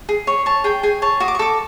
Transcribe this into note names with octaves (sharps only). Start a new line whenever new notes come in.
G#4
C#5
C#5 A5
G#4 G5
G#4 G#5
C#5 A5
F#4 D#6
D6
C#6
A4 D6